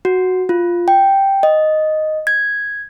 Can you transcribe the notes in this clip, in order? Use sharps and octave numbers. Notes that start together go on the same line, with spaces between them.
F#4
F4
G5
D#5
G#6